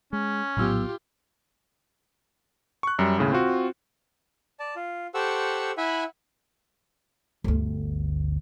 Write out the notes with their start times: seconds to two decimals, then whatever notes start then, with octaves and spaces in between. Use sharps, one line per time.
0.13 G#3 C#4
0.57 A#1 A2 C#3 F#3 B3 F4 G4 E6
2.83 C#6 F#6
2.99 F#2 G3
3.18 D#2 A2 C#3
3.32 C4 F4 F#4
4.60 D5 A5
4.76 F4
5.14 G4 A4 C5 F#5 C#6 E6
5.77 E4 E5 F#5 G#5 B5
7.44 G1 D2